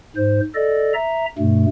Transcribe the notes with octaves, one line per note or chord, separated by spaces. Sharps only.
G#2 C5
A4 D5 D#5
E5 A#5
G2 B2 A3